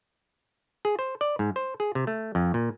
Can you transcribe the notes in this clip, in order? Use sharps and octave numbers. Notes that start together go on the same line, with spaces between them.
G#4
C5
D5
G#2
C5
G#4
C3
A3
F2
A#2